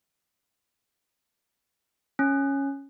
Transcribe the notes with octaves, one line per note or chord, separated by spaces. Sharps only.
C#4